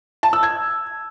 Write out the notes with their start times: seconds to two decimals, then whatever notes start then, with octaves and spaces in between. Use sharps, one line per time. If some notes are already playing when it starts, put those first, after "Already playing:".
0.23 A5
0.33 E6
0.43 G#6